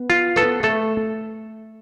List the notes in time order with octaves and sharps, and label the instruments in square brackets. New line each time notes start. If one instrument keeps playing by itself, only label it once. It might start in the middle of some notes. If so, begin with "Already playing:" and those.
Already playing: [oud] B3
[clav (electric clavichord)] F4
[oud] B3 [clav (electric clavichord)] A4
[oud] A3 [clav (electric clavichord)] A4